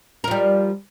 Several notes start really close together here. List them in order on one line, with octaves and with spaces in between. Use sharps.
A#4 F3 G3